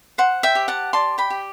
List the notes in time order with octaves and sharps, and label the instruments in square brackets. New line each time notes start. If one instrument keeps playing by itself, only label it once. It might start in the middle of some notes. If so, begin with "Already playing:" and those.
[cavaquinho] C5 F#5
E5 G5
G4
F#5 A5
D5 A5 C6
G5 B5
G4